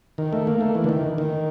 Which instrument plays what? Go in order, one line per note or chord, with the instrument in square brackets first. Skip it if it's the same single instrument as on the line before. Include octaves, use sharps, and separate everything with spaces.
[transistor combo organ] D#3
A3
A#3
A3
E3
D3
D#3
D#3